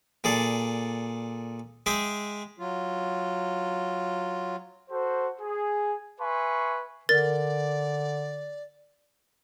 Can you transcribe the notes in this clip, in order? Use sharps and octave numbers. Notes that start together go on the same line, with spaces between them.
A#2 G#4 A4 D5
G#3 G#4 E5 G5
F#3 F4
F#4 A4 C5
G#4
B4 E5 G#5 C6 C#6
D3 A#4 D5 A6